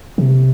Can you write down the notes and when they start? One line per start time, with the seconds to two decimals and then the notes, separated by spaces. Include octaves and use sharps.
0.18 C3